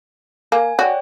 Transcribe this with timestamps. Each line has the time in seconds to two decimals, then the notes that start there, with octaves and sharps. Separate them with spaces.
0.52 A#3 G#5
0.79 F#4 C#5 D5 G5